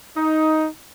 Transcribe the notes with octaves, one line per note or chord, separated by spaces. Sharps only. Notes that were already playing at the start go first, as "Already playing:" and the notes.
D#4